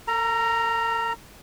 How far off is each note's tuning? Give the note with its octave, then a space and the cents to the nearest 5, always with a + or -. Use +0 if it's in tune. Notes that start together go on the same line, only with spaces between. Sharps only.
A4 +45 A#5 +0